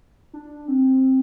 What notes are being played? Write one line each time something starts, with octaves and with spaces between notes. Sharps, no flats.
D4
C4